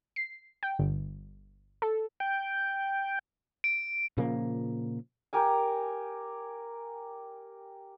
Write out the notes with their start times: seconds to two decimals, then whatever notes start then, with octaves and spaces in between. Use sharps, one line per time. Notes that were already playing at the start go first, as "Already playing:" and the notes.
0.16 C7
0.63 G5
0.79 G1
1.82 A4
2.20 G5
3.64 D7
4.17 A#2 C#3 F3 A#3
5.33 G4 A#4 G#5